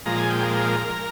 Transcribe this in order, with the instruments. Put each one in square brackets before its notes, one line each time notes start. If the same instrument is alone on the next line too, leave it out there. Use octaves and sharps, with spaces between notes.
[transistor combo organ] A#2 F3 G#3 A#5
G#5
G5
A#4
A#4